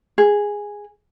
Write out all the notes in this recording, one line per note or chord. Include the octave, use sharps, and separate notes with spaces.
G#4